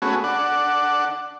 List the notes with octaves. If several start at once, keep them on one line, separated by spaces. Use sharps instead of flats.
A3 B3 C#4 F#4 G#4
D4 F#5